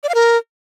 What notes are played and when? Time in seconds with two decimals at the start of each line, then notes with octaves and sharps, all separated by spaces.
0.04 D5
0.09 F5
0.15 A#4